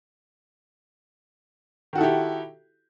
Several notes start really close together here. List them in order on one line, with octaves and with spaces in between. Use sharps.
D#3 F#4 A4 E4 G4